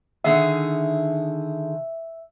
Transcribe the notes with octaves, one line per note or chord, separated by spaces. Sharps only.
D3 D#3 G#4 E5